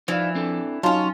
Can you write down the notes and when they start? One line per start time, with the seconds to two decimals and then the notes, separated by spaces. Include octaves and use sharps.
0.08 E3 F3 D#4 D5 F5
0.35 C4 D4 A4
0.83 F#3 C#4 D#4 F4 A5